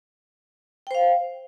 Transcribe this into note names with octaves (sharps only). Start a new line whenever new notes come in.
C5 F5 G5